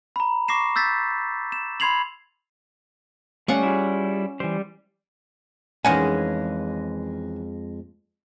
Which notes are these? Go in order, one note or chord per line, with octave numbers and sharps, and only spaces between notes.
A#5 B5
C#6 D6 A#6 C7 E7
E6 G6 A6 B6
E7
B5 C6 G#6 C7 F7 F#7
G3 A3 C#4 F5 F#5 C#6
E4 F4 G#4
E3 G3 C5
F2 D#3 E3 G#3 C#4 F#5 G#5